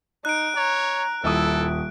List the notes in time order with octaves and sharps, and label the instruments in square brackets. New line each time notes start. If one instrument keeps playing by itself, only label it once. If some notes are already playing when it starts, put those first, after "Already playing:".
[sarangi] D#4 [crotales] F#6 D7
[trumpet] C#5 [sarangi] A#5
[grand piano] D#1 E5 D#6 [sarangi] E4 [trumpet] A4